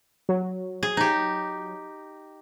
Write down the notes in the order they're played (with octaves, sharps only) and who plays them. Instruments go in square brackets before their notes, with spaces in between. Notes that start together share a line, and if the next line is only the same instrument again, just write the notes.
[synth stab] F#3
[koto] G#4
D#4 G4